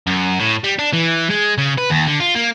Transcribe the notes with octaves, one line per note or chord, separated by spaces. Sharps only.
F#2
A2
G3
D4
E3
G#3
C#3
B4
D#2
D3
F4
A#3